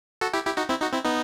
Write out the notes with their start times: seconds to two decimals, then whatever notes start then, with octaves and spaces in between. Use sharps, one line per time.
0.21 F#4 A4
0.33 E4 G4
0.46 E4 G4
0.57 D#4 F#4
0.69 C4 E4
0.81 D#4 F#4
0.93 C4 E4
1.05 B3 D#4